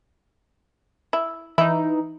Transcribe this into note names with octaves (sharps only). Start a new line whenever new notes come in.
E4
E3 D#4 E4